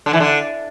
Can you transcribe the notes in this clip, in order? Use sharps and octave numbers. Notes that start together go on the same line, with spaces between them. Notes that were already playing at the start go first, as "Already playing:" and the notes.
D3
E3
D3